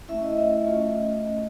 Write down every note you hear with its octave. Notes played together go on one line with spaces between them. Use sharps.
A3 C#4 E4 E5
D#5
D#5
A3 C#4 F4